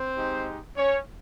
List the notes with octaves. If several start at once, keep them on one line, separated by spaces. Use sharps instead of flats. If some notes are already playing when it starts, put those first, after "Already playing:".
Already playing: C4 C5
G#3 D#4 G4
C#4 C#5